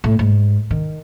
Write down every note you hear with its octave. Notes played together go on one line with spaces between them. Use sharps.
A2
G#2
D#3